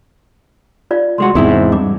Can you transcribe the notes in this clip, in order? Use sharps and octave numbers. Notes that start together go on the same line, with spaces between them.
F4 D5 F5
C2 G#3 F#4 C6 D6
E2 G#2 C3 E4
G2 D6